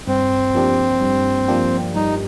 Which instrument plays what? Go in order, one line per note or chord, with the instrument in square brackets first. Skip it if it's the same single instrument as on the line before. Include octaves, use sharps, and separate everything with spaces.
[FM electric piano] G2 [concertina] C4
[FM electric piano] F3 A#3 D4 G4
G2
F3 A#3 D4 G4
[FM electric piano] G2 [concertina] D#4